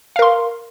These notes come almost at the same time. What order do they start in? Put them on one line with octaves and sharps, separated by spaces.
F5 A#4 C6